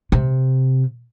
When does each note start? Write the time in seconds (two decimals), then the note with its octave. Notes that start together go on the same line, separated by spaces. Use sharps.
0.12 C3